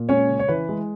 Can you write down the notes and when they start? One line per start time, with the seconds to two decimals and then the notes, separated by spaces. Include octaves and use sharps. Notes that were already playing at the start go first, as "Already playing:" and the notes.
Already playing: A#2
0.09 G#3 C#4 C#5
0.29 C#3
0.39 C#5
0.48 E3 B4
0.69 G#3